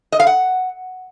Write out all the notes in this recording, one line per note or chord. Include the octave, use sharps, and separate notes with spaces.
D#5
F5
F#5